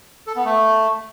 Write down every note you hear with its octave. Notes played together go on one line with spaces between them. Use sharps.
A4
B3
A3